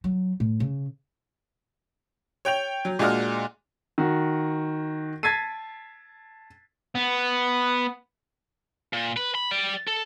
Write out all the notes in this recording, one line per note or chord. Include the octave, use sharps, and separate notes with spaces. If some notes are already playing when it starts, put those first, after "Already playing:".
F#3
A2
C#3
C#5 G5 G6 F7
F#3
A#2 G#3 D4 F#4 D#5 F6
D#3 F#4
A5 G#6 A6 B6 C7 D#7
B3
A#2
B4
B5
G3 D5
A4